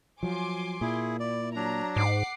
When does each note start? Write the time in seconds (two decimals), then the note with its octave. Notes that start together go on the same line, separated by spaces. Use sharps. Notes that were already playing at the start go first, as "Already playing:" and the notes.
0.23 F3 F#3 G#5 C6 D6
0.81 A#2 E4 G#4
1.20 E4 D5
1.56 F#3 D4 A#5
1.96 G#2 F#5 D6 C7